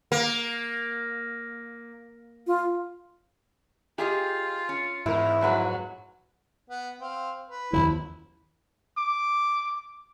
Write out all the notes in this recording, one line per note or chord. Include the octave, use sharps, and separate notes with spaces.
A#3
F4
F4 G4 G#4 D#5
C#4
E2 G#2 E4 A#4
F2 F#3 G#3 B4
B3
C4 F5
B4
D#2 D#3 F3 E4
D6